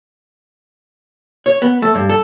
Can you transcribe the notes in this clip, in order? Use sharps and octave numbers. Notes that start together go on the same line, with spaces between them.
C#5
B3
A3
G2
A4